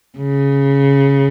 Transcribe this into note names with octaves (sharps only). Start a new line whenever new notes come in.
C#3